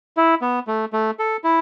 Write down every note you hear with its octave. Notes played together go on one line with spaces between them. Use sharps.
E4
B3
A3
A3
A4
E4